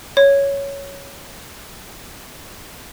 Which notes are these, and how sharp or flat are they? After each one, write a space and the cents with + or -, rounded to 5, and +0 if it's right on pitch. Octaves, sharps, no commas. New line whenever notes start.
C#5 +5